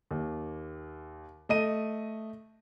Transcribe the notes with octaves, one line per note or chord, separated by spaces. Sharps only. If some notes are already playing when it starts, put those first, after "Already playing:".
D#2
A3 D#5 D#7